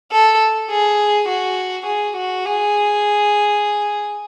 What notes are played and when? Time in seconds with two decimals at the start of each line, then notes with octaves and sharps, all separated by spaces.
0.12 A4
0.70 G#4
1.29 F#4
1.86 G#4
2.17 F#4
2.46 G#4